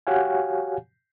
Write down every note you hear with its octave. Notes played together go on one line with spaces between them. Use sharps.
F#4 G4 C#5 F5 F#5 G#5